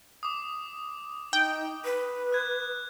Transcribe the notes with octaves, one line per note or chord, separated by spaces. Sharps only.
D6 D#6
D#4 G5
B4
F#6 G#6